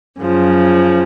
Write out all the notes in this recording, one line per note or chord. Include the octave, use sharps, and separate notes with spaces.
F#2 C#3 F3